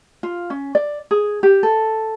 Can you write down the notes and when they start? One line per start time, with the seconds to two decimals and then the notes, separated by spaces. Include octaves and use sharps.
0.23 F4
0.50 C#4
0.75 D5
1.11 G#4
1.43 G4
1.63 A4